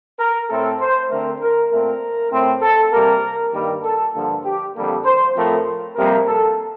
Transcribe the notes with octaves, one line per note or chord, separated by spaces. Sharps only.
A#4
A2 A3 C4 A4
C5
D3 A3 C4 A#4
A#4
A#2 A3 C4 A#4
A2 A3 C4
A4
C3 G3 A#3 A#4
G2 D#3 G3 A#3 A#4
A4
G2 D3 F3 A#3 A4
G4
F2 D3 G3 A#3 A4
C5
A2 F3 A3 C4 A#4
F2 C3 G3 A#3 A#4
A4